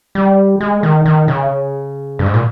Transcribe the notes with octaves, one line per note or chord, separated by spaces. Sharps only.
G3
G#3
D#3
D#3
C#3
G2
G#2
A#2